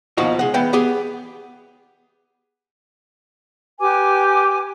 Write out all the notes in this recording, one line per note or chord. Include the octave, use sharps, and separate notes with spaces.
D#2 B2 F3 D#4 F#4
G#3 F#5
E3 B3 G5
B3 G4 G#4
G4 B4 G#5 D6